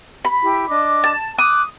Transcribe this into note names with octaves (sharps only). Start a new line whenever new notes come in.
B5
E4 G4
D4 D#5 D6
A5
D6 D#6 F#6